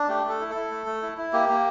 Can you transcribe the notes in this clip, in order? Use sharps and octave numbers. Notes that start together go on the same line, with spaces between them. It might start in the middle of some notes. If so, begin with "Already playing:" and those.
Already playing: D4
A3 G4
A3 A4
E4
E4 A4
A3
A3
E4
E4
A#3 G4
A#3